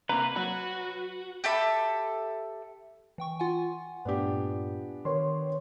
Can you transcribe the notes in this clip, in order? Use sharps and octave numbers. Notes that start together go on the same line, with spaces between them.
C3 A#3 B4 A#5
F#3 F#4
G4 A4 E5 B5
E3 G5 C#6
F4 F#5 G#5
G2 A#2 A3 B3 D4 G4
D#3 B4 C#5 C6